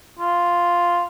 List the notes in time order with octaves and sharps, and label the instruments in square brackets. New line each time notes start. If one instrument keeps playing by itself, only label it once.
[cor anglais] F4